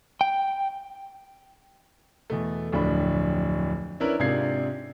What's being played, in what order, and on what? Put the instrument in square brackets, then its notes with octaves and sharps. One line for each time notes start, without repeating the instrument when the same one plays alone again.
[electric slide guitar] G5
[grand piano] E2 B2 A3
D1 F2 D4 B5
C#4 D4 E4 A#4 B4
G#2 C3 D4 F4 G#6 C7